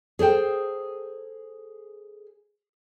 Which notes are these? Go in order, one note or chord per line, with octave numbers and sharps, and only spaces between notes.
G#4 A4 C5 G5